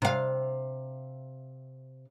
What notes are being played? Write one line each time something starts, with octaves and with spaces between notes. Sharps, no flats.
C3 F5